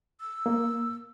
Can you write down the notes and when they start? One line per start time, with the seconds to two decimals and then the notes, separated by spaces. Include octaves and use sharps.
0.20 E6
0.46 A#3